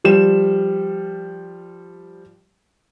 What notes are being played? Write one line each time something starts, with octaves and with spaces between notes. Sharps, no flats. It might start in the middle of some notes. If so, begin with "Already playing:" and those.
F3 G3 E7